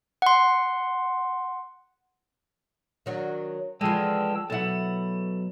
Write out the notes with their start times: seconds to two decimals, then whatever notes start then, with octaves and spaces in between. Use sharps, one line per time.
0.22 F#5 C6
3.06 D#3 F#3 D4
3.81 D3 E3 F3 G#3 G5 A5 E6
4.50 B2 F#3 E4 A4 F#5